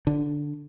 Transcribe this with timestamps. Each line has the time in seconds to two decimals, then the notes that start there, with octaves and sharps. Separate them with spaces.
0.07 D3